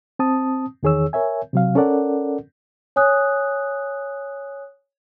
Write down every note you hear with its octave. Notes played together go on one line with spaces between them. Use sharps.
C4 A5 D#6
E2 D#3 G#4 C#5 E6
A#4 C#5 E5 G#5
C3 F#3 F5
C#4 A4 A#4 D5 F#5
C#5 G#5 D#6 F#6